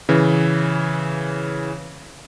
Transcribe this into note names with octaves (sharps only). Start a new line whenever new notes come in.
C#3 E3